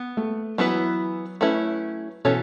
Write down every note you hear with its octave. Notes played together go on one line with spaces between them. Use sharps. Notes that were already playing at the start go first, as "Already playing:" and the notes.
Already playing: B3
A3
E3 F#3 B3 E4 B4
A3 C#4 E4 B4
B2 E3 C#4 A4 C#5